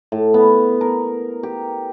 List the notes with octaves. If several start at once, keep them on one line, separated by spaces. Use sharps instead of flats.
A2
B3
A#4
G4